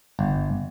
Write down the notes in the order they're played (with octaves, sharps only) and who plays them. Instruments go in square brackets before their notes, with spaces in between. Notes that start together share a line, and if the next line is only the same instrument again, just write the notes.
[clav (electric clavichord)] G1